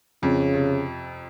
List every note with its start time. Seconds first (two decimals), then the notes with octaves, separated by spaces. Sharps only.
0.23 F2 C#3
0.53 C3